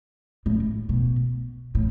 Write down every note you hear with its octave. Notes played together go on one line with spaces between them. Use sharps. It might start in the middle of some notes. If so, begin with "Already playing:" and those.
A2
B2
A2